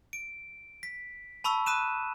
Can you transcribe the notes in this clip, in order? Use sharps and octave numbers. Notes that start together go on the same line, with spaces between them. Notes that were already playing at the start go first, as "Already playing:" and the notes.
D7
B6
A5 B5 C#6 E6
B5 D#6 F#6 D#7 E7